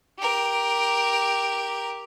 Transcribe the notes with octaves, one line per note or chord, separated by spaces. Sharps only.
G4 A#4